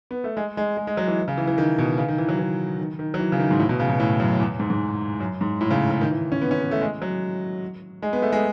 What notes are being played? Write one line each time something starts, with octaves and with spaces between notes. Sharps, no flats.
B3
A3
G#3
G#3
G#3
G#3
F#3
E3
C#3
E3
E3
D#3
B2
C#3
D#3
E3
F#3
E3
D#3
D#3
F#3
E3
C#3
D#3
G#2
A2
B2
C#3
B2
A2
F#2
E2
G#2
G#2
F#2
G#2
A2
C#3
C#3
D#3
E3
C#4
B3
C#4
B3
A3
G#3
F#3
G#3
B3
A3
G#3